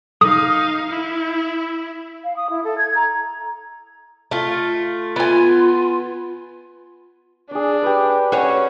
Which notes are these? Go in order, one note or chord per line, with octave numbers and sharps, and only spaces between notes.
D#4 F5 D#6
E4
F5
D#6
E4
A4
G#6
A#5
A3 F4
B3 F4 G#5
D4 G#4 D5
G4 B4
C#4 F#4 G#4 C#5